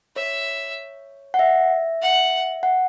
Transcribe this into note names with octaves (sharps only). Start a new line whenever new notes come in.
C#5 E5
F#5
E5
F#5
F#5